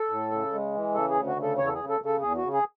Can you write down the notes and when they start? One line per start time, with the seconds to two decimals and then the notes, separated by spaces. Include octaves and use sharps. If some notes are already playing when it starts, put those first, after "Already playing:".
Already playing: A4
0.09 A2
0.32 C#3
0.53 G#3
0.74 E3
0.94 C#3 A4
1.10 G#4
1.15 D2
1.27 F#4
1.36 C#3
1.42 A4
1.58 E2 C#5
1.67 A4
1.74 C#3 G#4
1.89 A4
2.00 C#3 A4
2.21 E2 G#4
2.37 C#3 F#4
2.53 G#4